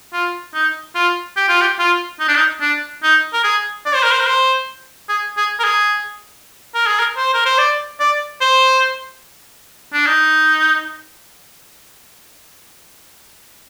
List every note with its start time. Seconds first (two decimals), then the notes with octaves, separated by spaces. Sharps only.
0.13 F4
0.54 D#4
0.95 F4
1.37 G4
1.49 F4
1.61 G4
1.79 F4
2.20 D#4
2.28 D4
2.36 D#4
2.61 D4
3.03 D#4
3.33 A#4
3.44 G#4
3.86 D5
3.95 C5
4.03 A#4
4.12 C5
4.20 A#4
4.27 C5
5.09 G#4
5.37 G#4
5.59 A#4
5.64 G#4
6.75 A#4
6.87 G#4
7.00 A#4
7.17 C5
7.34 A#4
7.46 C5
7.58 D5
8.00 D5
8.41 C5
9.93 D4
10.07 D#4